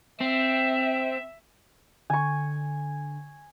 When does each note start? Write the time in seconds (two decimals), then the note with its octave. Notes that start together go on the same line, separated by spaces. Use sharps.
0.21 C4 E5
2.10 D3 G#5 C#6